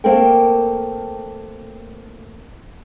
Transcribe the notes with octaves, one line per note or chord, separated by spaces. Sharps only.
A3 A#3 C4 A4 A#4 G5